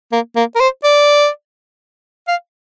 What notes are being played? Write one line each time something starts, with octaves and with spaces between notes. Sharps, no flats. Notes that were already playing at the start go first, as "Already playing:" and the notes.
A#3
A#3
A#4
C5
D5
F5